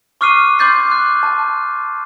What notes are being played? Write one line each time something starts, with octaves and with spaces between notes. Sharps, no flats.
C#6 D6 F6 F#6 C7 D#7
C6 D6 G6 A6 C7
F#6
A5